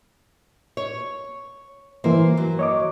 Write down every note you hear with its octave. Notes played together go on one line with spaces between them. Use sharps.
C#5
G2 E3 A#3 C5
F#3
C#5 D#5 D6